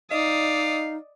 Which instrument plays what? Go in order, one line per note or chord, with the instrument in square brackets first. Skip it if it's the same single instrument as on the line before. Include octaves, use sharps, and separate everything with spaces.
[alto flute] D#4 [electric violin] D5 D#6 [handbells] D#5 [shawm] F5